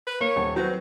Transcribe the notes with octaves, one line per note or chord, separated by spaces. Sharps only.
B4
A#3 C#5
D#1
F#3 C4 F#4 B4